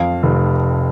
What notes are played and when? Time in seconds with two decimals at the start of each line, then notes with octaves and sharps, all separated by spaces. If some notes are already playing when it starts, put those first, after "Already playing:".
Already playing: F2 F5
0.23 F1